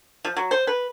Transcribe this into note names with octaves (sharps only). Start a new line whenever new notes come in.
F3
F#3
C5
B4